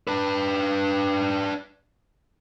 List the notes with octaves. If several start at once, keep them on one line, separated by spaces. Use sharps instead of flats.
D4 B4